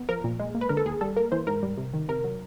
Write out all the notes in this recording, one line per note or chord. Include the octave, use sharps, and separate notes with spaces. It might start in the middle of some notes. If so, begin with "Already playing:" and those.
Already playing: B3
F3 A#4
A#2
G#3
A#3
B4
D3 A#4
A4
D#2 G#4
G3 A4
A#3 A#4
E3 C5
G#2 A#4
G3
C3
D#3
C3 A#4
F#3